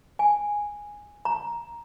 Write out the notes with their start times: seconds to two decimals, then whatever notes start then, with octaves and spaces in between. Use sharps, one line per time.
0.19 G#5
1.25 A#5